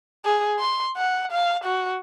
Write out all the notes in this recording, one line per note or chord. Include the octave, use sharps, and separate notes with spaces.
G#4
C6
F#5
F5
F#4